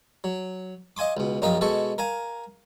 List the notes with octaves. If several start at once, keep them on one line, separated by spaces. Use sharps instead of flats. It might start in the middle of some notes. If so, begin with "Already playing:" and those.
F#3
D#5 F5 G#5 C6 D6
C#2 B2
A#1 F#2 A#4 D#5 F5 G5
B2 G#3 A4 A5 C#6
A#4 F5 G#5 A#5